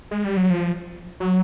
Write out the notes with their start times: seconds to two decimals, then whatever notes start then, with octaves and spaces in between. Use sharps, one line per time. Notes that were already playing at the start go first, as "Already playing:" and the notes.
0.11 G#3
0.24 G3
0.37 F#3
0.50 F3
1.20 F#3